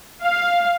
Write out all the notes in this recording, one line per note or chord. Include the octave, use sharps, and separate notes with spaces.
F5